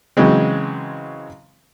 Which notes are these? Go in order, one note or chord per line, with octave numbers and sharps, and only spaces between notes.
C#3 E3 F#3 G#3 C4